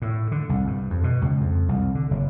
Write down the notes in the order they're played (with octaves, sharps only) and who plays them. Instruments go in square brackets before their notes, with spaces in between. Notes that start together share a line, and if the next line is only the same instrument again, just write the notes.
[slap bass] A2
D3
C2
G2
F2
B2
C#2
F2
C2
D3
F#1